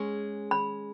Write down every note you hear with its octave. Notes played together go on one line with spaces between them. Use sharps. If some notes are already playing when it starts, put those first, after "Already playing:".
Already playing: G#3 C#4 G#4 C#5
B5